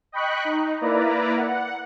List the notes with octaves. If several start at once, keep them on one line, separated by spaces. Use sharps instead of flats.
D#5 G5 B5 C#6 F#6
D#4
A#3 E4 B4 D5 A#5
F#5